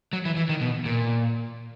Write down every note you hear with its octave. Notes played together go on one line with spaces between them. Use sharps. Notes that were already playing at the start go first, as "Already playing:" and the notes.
F#3
E3
E3
D#3
B2
A#2